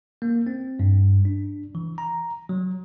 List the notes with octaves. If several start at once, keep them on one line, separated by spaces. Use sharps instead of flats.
A#3
C4
G2
D4
E3
A#5
F#3